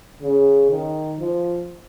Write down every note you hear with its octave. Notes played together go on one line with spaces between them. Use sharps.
C#3
D#3
F3